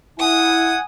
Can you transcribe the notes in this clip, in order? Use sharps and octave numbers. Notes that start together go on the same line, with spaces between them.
E4 F#5 G#5 D#6